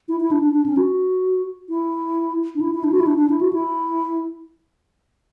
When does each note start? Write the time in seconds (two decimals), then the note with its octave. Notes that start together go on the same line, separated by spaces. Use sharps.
0.08 E4
0.20 E4
0.31 D4
0.43 D4
0.54 D4
0.66 C#4
0.77 F#4
1.69 E4
2.55 D4
2.61 E4
2.74 E4
2.84 D4
2.92 F#4
3.00 E4
3.07 D4
3.18 D4
3.30 E4
3.41 F#4
3.53 E4